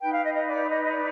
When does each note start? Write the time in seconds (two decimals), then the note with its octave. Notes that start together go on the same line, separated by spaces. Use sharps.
0.01 D#4 B4 G5
0.13 F5
0.24 D#5
0.35 D#5
0.46 D5
0.69 D#5
0.83 D#5
0.91 D5